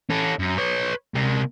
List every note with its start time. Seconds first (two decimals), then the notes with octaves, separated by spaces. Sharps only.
0.10 C#4 A4
0.39 F#2
0.58 B4 C#5
1.15 C3 A#4